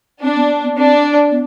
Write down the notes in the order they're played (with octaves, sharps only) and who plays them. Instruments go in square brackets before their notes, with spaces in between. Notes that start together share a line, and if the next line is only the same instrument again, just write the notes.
[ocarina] C4 [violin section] D4
[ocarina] B3
B3
[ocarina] C4 [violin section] D4
[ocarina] B3